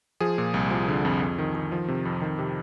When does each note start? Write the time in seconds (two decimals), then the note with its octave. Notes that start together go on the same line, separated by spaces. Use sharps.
0.20 F3 G#4
0.38 A#2
0.54 C2
0.71 F3
0.88 D3
1.05 F2
1.22 F2
1.38 D#3
1.55 D#3
1.72 F3
1.88 C3
2.05 F2
2.22 D#3
2.39 C3